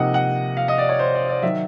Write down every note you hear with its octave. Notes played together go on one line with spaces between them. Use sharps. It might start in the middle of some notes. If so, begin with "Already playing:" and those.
Already playing: C3 F3 A#3 D#4 D#5 F#5
F#5
F5
D#5
D5
C#5
C5
D5
D5
D#3 F#3 E5